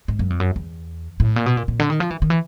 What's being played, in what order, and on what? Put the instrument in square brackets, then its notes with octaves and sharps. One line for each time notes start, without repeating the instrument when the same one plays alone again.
[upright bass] G#2
F#2
F2
F#2
E2
A2
A#2
B2
A#2
A#2
D3
D#3
F3
E3
D#3
E3